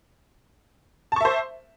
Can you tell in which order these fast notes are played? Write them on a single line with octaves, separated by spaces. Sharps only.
A5 C#6 E5 C5